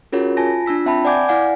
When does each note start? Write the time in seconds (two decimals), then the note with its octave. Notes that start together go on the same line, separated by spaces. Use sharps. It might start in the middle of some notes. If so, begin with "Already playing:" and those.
0.12 C#4 F4 F#4 G#4 A#4 C#5
0.37 F4 G#5 A5 A#6
0.66 D4 F4 E6 B6
0.86 C4 E5 G5 A5 B5
1.05 D5 F#5 G#5 D6 G6 G#6
1.28 E4 D5 F5 F#5 G#5